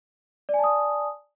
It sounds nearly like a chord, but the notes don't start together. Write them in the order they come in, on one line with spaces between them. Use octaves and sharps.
D5 G#5 A5 D#6